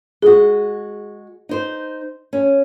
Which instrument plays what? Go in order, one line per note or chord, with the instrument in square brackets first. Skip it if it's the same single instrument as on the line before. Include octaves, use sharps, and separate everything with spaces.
[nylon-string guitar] G#3 F#4 [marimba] G#4
[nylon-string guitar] D#4 C5
C#4